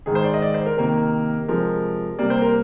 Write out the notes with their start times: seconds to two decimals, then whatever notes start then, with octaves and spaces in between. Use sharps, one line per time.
0.06 G#2 D#3 G#3 G#4
0.15 C5
0.24 D5
0.34 D#5
0.42 D5
0.54 C5
0.66 A#4
0.77 C3 D#3 A#3 A#4
1.48 C3 F3 G#3 A#4
2.19 C3 G3 A#3 D5
2.30 C5
2.42 A#4